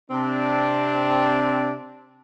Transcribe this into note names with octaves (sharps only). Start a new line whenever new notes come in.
C3 C4 D4